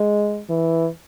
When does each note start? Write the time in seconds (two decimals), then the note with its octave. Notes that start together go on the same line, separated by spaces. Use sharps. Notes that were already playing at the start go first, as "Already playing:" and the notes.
Already playing: G#3
0.50 E3